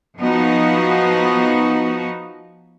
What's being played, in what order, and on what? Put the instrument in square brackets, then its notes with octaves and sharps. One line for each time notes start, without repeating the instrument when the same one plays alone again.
[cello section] F3 B3 D#4 F#4